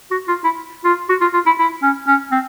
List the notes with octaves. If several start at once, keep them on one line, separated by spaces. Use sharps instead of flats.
F#4
F4
E4
F4
F#4
F4
F4
E4
E4
C#4
C#4
C4